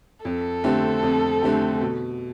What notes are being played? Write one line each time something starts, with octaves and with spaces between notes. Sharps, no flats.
F2 A4
D3 A3 C4 G4
F2
D3 A3 C4 G4
B2